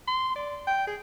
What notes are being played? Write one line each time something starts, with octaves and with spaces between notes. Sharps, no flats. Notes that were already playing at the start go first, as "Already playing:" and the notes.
C6
D5
G5
G#4